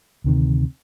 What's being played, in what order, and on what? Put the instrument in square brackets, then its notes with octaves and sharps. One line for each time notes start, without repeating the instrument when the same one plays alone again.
[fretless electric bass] D2 C3 D#3